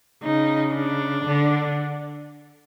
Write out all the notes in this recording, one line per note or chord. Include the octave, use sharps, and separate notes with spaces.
C#3 D#4
D4
D3